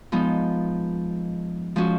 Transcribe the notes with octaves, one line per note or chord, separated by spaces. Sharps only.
F3 G#3 B3 D#4
F3 G#3 C#4 F#4